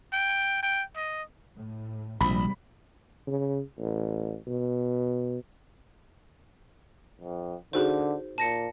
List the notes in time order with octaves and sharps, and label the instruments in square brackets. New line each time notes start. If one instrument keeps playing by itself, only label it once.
[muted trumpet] G5
G5
D#5
[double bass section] A2
[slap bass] A#1 [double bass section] G#2 C3 G3 [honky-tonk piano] B5
[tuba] C#3
A1
B2
[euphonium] F2
[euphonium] D3 [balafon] D#4 F#4 G#4 [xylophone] C5
[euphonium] A#2 [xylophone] A5 A#6 C#7